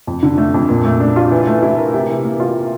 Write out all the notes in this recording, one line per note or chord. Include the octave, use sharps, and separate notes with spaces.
F2
D3
A3
F2
A#2
A3
D4
F4
E3
A3
E4
A#4
C3
E3
A#3
F4